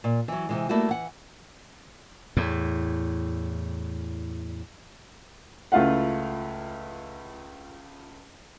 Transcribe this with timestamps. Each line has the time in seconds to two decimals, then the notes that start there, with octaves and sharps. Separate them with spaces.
0.04 A#2
0.28 E3 F#3
0.49 C3 E3 G#3
0.69 G3 A3 A#3 E4 F#4
0.89 E3 F#5
2.37 E2 A2
5.72 C#2 A3 E4 F4 F5 F#5